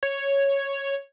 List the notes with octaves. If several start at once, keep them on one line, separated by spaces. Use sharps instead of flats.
C#5